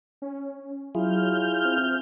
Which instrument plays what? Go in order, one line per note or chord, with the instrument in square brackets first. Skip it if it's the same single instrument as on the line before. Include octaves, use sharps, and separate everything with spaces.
[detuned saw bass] C#4
[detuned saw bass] F#3 [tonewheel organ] E4 F4 G#4 [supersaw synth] F6 G6
[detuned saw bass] C4